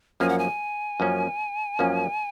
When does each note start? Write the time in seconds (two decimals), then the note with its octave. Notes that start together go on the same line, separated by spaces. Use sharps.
0.20 F#2 F3 A#3 C#4 G#5
0.29 F#5
0.39 G#5
1.00 F#2 F3 A#3 C#4
1.79 F#2 F3 A#3 C#4